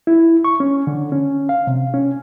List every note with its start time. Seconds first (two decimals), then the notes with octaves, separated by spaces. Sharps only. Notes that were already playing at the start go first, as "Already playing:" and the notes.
0.07 E4
0.44 C#6
0.60 C#4
0.87 D3
1.12 C#4
1.49 F5
1.67 C3
1.94 C#4